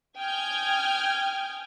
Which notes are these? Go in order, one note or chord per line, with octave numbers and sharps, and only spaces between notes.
G5 G#5 D#6 F6 G6 G#6